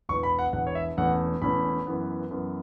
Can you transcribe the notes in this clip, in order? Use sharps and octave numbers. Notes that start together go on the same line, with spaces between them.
E1 E2 E3 C#6
B5
F#5
E1 E2 E3 F#5
C#5
E5
E1 E2 E3 A3 C#4 F#5
E1 E2 E3 A3 C#4 B5
F#2 E3 B3
F#2 E3 B3